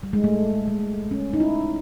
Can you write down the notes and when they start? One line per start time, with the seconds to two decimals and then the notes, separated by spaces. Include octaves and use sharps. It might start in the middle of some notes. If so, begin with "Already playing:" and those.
0.03 G3
0.13 G#3
0.24 A3
0.68 G#3
1.11 C#4
1.33 D#4
1.40 E4